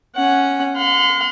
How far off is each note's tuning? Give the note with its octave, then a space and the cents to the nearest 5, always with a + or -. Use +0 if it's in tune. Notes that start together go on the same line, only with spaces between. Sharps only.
C#4 +0 F#5 +0
F5 +40 C6 -35